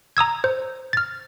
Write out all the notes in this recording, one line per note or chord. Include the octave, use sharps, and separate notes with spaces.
A#5 D#6 E6 G#6
C5
F6 A6